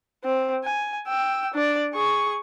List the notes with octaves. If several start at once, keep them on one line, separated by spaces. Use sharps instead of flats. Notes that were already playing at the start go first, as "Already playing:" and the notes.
C4
G#5
G5 E6
D4 D5
G#4 C#6